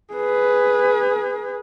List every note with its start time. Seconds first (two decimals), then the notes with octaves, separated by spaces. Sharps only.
0.13 G#4 B4